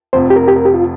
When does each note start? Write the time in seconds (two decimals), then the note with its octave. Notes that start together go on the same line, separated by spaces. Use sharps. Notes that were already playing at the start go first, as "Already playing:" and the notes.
0.13 F1 F2 C3 F3 C5
0.30 G4
0.36 A#4
0.48 G4
0.56 A#4
0.65 G4
0.74 F4